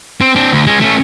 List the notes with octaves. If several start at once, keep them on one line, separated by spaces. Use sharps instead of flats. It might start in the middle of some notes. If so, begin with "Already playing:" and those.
C4
C4 D4
D2
G#3 C#4
A3 C#4